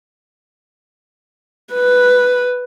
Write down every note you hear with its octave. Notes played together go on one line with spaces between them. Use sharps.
B4